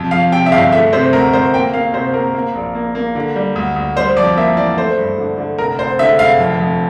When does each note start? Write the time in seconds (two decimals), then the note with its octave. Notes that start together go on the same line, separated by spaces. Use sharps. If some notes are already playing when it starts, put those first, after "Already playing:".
Already playing: F2 C3
0.11 F2 F5
0.32 C3 G5
0.46 E5
0.52 G1 F5
0.72 A3 E5
0.93 C3 C5
1.13 D2 A#4
1.33 D2 C5
1.53 A#3 G5
1.74 A#3 F5
1.94 C3 C5
2.14 A#3 A#4
2.35 A#3
2.55 A#1
2.75 A#3
2.95 A#3
3.15 D3
3.36 G3
3.56 D2
3.76 D2
3.96 G3 C5
4.17 F2 D5
4.37 A#3 E5
4.57 E3 D5
4.77 A3 C5
4.97 G2
5.18 D3
5.38 D3
5.58 F1 A#4
5.79 F1 C5
5.99 D3 E5
6.19 F1 F5
6.40 F2
6.60 F2